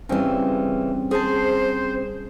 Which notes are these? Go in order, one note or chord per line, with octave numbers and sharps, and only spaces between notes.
C#3 E3 G3 C4 C#4
G#4 C5 A5